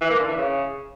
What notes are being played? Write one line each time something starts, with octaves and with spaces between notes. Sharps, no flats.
E3
A#3
D3
E3
C#3